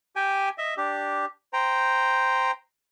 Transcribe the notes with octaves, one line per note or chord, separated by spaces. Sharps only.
G4 G5 G#5
D#5 E5
D4 G4
C5 G5 A#5